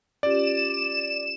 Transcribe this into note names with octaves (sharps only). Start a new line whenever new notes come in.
C#4 F4 G4 D5 E7